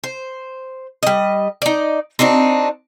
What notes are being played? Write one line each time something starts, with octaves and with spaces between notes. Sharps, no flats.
C5
G3 D#5
D#4 D5
C4 D4 D#4 F#4